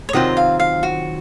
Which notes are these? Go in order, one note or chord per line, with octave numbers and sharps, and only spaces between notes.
C#5
C3 D#3 F#3 C4 F4 D#5
F5
F5
F#4